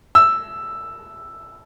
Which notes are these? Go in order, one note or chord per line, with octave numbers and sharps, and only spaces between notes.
E6